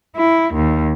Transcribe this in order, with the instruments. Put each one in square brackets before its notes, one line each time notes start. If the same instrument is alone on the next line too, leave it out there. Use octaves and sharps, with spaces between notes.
[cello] E4
D#2